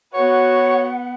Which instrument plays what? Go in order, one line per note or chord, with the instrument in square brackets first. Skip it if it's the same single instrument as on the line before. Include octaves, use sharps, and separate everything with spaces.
[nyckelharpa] B3 B4 [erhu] F#4 [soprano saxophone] C#5 [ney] F#5